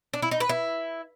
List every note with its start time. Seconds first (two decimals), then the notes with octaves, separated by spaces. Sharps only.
0.13 D4
0.22 E4
0.31 D#4
0.40 B4
0.49 E4